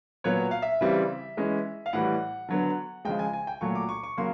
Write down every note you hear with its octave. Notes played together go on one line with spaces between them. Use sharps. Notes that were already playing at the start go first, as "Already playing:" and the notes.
A#2 F#3 B3 C#5
F5
E5
C#3 E3 G3 C4
E3 G#3 C#4
F5
A2 E3 G3 F#5
D3 F#3 B3
C#3 F3 G#3 G5
G#5
G#5
G5
A#2 F#3 A3 C#6
D6
C#6
C#6
C#3 F#3 A#3 C6